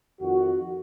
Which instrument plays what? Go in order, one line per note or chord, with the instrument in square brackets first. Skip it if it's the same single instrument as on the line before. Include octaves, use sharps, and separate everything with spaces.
[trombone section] F2 D#3 F#4